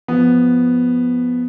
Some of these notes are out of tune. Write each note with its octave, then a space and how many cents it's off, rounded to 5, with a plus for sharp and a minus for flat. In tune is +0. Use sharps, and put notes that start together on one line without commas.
F3 +0 B3 +0